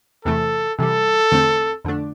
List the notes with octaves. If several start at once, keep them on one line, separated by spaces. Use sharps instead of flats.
E2 C3 E3 A3 A4
C3 E3 G3 A4
E2 D3 A3 C4
F2 D3 A3 D4